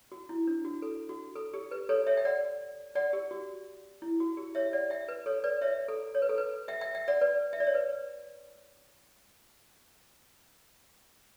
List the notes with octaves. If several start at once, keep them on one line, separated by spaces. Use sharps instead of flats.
F#4
E4
D4
F#4
A4
F#4
A4
G4
B4
A4 C#5
C#5 E5
G5
D5 F#5
D5 F#5
G4
F#4
E4
F#4
G4
C#5 E5
D5 F#5
E5 G5
B4
A4 C#5
B4 D5
C#5 E5
A4
C#5
B4
A4
B4
E5 G5
E5 G5
E5 G5
D5 F#5
B4 D5
E5
D5
C#5
B4